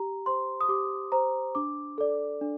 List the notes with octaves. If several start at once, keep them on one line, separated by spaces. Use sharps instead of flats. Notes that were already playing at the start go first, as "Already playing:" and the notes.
Already playing: G4 A#5
C5 C6
D#6
G4 D6
C5 A#5
D4 D6
A4 D5
D4